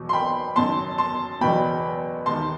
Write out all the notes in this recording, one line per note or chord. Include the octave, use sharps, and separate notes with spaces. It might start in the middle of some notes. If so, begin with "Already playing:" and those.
Already playing: E2 B2 F#3
C6
G5 B5
F#1 F#2 D#3 F#3 A5 C6
A5 C6
F#1 E2 B2 F#3 G5 B5
E1 D#2 D#3 A5 C6